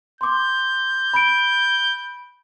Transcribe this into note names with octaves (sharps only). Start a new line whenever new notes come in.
C6 D6 G6
B5 D7